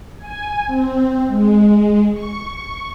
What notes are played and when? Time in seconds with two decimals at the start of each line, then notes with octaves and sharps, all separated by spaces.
0.18 G#5
0.67 C4
1.27 G#3
2.12 C#6